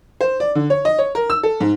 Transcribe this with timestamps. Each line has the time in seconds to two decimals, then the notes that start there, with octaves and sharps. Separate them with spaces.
0.21 C5
0.40 D5
0.55 D3
0.70 C#5
0.85 D#5
0.99 C#5
1.15 A#4
1.30 E6
1.43 A4
1.60 G#2